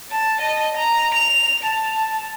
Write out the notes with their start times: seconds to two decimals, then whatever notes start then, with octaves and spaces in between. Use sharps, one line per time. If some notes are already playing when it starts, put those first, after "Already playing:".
0.10 A5
0.41 D#5
0.77 A#5
1.14 F7
1.63 A5